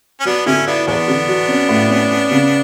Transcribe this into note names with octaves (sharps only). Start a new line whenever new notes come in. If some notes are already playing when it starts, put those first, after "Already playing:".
C#4
F#3 B3 D4
D3 C#4 E4
B3 D4 E4
E2 B3 D4
D3
F#3
C#4
A2
C#4
C#4
C#3